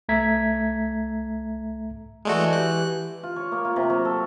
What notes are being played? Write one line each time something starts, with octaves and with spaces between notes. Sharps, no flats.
C2 A3 E5 A#5 G#6 B6
E3 G#3 A3 F#4 D5
G4 F#6
F4
C#5
A#3
F4
C3
F#3
A4